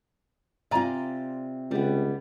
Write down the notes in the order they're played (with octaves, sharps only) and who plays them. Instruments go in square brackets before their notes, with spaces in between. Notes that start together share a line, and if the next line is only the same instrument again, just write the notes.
[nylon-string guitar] C3 F4 [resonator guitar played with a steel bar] D5 G#5 A#5
[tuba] C#2 [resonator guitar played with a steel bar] G3 B3